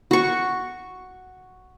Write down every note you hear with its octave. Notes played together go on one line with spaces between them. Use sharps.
F#4 C#6